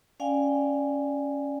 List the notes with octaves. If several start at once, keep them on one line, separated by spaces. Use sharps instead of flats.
C#4 D5 F5 G5 G#5